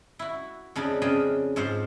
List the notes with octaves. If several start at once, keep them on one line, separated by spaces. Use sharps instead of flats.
E4 F#4
F2 C#3 D4 D#4
C#3 D4 F4 G4 D#5
F2 G#2 F4 C5 F#5